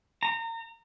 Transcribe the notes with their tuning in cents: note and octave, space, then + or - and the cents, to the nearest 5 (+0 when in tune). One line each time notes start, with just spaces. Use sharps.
A#5 -30